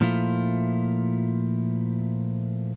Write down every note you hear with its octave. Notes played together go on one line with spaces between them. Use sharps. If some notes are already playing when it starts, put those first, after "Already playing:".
A#2 F3 A3 E4 F4